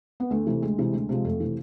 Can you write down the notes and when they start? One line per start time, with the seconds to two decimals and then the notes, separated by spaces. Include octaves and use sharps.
0.20 B3
0.30 D2 A3
0.47 C3 E3
0.62 D2 G#3
0.78 C3 E3
0.93 D2
1.09 C3 F3 G#3
1.24 F2 A3
1.40 C3 E3